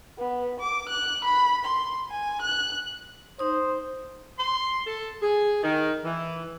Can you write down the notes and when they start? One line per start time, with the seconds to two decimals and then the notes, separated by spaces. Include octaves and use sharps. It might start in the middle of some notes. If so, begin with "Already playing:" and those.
0.18 B3
0.60 D6
0.89 F#6
1.25 B5
1.65 C6
2.11 G#5
2.42 F#6
3.39 D#4 C5 D#6
4.38 C6
4.86 A4
5.22 G#4
5.62 D#3
6.04 E3